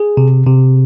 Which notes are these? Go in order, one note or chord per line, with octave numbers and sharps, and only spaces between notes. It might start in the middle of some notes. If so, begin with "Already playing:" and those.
Already playing: G#4
C3
C3